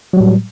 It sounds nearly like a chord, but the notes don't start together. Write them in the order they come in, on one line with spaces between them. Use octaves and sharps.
F#3 G3 A2